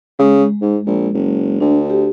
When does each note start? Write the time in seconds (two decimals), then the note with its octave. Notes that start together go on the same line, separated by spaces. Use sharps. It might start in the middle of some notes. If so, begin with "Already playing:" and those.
0.19 C#3 G#3
0.61 G#2
0.86 A#1
1.14 F#1
1.60 D2 D4
1.90 G4